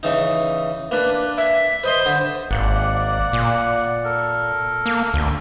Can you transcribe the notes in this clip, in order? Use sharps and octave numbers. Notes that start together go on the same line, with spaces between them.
C#3 E3 D#4
A#3 D4 B4
E5
B4 C5 D#5 C6
D3
G#1 A#3 D5 F#5
A#2
A4 A#4
A#3
D2